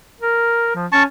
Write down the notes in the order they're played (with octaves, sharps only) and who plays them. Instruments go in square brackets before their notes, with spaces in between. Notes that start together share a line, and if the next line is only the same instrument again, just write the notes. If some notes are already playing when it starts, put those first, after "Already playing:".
[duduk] A#4
F3
[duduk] C#4 [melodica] A5 C#6